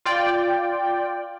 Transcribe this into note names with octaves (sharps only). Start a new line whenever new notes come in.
F4 D5 G5